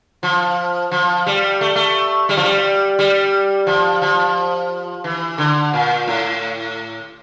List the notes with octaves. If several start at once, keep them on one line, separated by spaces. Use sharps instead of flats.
F3
F3
G3
A3
A3
G3
F3
G3
G3
F3
F3
E3
D3
A#2
A2